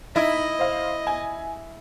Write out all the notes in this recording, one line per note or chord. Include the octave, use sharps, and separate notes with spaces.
D#4 E4 D#5
C5 F5
G#5